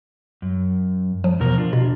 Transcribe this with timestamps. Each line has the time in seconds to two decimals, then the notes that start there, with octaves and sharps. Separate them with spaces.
0.42 F#2
1.24 F3
1.40 E2 B2 A#4
1.58 D4 F4
1.73 B2